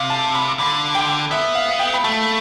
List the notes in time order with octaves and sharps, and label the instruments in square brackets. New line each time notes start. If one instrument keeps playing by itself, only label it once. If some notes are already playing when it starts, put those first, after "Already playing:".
Already playing: [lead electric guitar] C3 [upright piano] F5
[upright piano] A5
B5
[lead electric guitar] D3 [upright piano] B5
[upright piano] G5
[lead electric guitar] B3 [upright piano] E5
[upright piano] F5
F5
G5
B5
[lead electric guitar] A3 [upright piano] A5